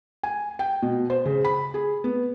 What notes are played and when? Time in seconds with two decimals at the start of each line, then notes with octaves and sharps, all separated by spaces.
0.23 G#5
0.59 G5
0.82 B2
1.10 C5
1.26 C#3
1.45 B5
1.74 G#4
2.04 B3